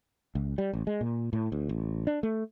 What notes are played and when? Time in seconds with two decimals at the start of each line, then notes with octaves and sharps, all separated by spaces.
0.35 C#2
0.58 G3
0.73 A1
0.87 G#3
1.01 A#2
1.33 A2
1.52 D2
1.69 A1
2.07 D4
2.23 A3